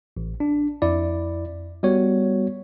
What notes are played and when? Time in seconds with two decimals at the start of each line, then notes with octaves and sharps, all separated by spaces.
0.17 A1
0.40 D4
0.82 F2 E4 D5
1.83 G3 B3 F#4 C#5